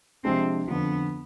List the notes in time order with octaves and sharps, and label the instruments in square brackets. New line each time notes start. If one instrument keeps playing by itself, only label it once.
[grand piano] C3 F3 G#3 D4 [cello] C4
[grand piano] F2 D3 F3 [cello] B3